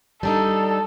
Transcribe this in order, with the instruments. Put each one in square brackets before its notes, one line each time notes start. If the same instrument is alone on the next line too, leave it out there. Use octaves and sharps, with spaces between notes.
[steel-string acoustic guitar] G3 D4 D#4 [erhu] A4